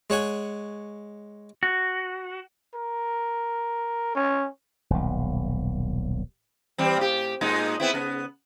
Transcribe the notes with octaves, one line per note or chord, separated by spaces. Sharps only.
G#3 C#5 F#5 G#5
F#4
A#4
C#4
D#1 B1
E3 G3 C4
A2 G4
A#2 G#3 D#4
B3 C4 E4
C#3 B3